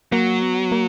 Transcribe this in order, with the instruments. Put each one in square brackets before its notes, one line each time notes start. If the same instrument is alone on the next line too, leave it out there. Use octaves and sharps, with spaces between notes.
[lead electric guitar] F#3 [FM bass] A#3
[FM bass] B3
A#3